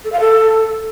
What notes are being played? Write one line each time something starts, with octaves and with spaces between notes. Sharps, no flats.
A4
F5
A4